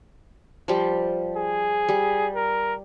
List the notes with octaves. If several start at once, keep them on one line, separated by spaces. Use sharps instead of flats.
F3 G3
G#4
G3
A#4